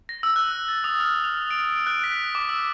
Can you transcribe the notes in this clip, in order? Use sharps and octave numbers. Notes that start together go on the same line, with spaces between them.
A#6
E6
F#6
A6
D#6
F6
F7
D7
F#6
B6
D6
E6